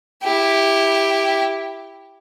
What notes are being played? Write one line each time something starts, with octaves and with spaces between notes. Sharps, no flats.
E4 G4